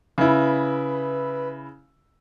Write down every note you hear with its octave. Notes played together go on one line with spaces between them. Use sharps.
C#3 E4 B4